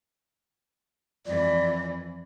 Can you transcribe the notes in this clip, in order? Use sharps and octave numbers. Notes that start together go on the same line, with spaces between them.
F2 E3 D5